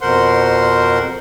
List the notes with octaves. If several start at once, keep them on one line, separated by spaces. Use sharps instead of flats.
F2 B2 A#4 C5 F#5 C6